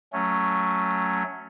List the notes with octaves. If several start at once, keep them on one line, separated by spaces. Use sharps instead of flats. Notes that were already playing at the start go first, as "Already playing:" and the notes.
F#3 A3 C#4